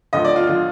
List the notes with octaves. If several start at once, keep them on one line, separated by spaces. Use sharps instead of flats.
D2 D3 F3 D#5
D5
F4
D3 F3 F4